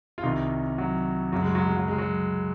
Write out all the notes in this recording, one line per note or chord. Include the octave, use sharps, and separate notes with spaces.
F4
C2 C3 D#3 D#4
F#3
F#2 C#3 F#3
G#3
F#3
G#3
F#3
G#3
F#3